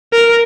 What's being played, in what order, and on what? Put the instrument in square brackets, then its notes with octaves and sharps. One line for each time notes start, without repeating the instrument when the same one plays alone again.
[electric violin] A#4